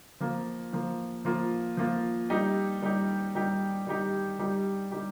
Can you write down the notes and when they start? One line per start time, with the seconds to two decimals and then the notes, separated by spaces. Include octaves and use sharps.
0.20 F3 A#3 F4
0.73 F3 A#3 F4
1.25 F3 A#3 F4
1.77 F3 A#3 F4
2.30 G3 D#4 G4
2.82 G3 D#4 G4
3.35 G3 D#4 G4
3.87 G3 D#4 G4
4.39 G3 D#4 G4
4.91 G3 D#4 G4